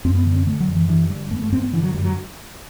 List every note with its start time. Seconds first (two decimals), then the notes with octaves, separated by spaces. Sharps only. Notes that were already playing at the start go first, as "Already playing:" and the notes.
0.05 F#2 C4
0.15 B3
0.25 D3 B3
0.36 C4
0.47 D3 A3
0.60 F#3
0.68 F#2
0.74 E3
0.89 G2 E3
1.09 D3 G3
1.31 G2 A3 B3
1.42 A3
1.52 G2 C4
1.63 B3
1.73 D3 E3
1.83 F#3
1.94 F#2 G3
2.04 F#3